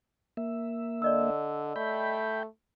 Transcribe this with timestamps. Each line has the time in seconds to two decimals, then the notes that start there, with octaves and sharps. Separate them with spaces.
0.37 A#3 E5
1.02 D3 D5 D#5 E6
1.76 A3 G5 B5